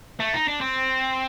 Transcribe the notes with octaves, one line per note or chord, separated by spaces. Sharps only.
A3
D#4
D4
C4